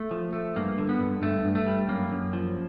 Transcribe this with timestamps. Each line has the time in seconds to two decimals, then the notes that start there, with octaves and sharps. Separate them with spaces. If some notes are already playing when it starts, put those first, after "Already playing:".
Already playing: A3
0.11 F3
0.33 A3
0.56 G2 A#3
0.78 D3
0.89 B3
1.00 G2
1.22 G2 A3
1.45 G2
1.55 A3
1.66 G3
1.88 F#2 A#3
2.12 F#2
2.33 F3